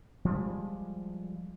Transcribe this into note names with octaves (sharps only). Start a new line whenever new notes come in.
F3 G3 G#3